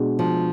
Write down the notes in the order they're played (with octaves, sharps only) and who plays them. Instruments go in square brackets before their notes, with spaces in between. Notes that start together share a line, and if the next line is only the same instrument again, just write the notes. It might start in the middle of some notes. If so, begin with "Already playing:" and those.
Already playing: [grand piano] B2 G#3 D4 F#4
[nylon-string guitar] F3